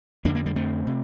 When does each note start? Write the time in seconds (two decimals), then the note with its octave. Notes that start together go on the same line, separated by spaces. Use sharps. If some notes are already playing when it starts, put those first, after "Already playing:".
0.25 F2 D3 A#3 D4
0.35 A#3 D4
0.46 G3 A#3
0.56 A3 C4
0.87 C3